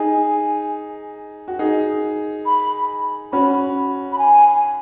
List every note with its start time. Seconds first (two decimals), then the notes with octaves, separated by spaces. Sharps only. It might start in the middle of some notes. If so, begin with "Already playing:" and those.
Already playing: D#4 G#4 G#5
1.48 F#4
1.59 D#4 G#4
2.46 B5
3.32 C#4 F#4 B5
4.12 B5
4.19 G#5